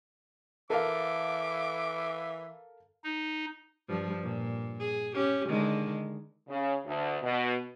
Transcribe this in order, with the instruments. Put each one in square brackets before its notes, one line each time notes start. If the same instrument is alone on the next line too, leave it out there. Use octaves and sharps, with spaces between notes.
[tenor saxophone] E3 [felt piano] A4 A#4 F5 [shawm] D6
[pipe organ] D#4
[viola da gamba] G2 F3
A#2
G#4
C#4 G4
D3 D#3 G#3
[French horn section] C#3
D2
B2